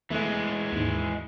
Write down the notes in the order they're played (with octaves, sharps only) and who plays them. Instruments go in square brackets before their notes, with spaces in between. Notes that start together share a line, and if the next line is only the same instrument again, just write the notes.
[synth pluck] E2 A3 [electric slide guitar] E3 G#3
[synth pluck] D#2 G#2